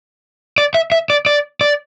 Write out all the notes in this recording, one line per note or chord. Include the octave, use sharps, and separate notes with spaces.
D5
E5
E5
D5
D5
D5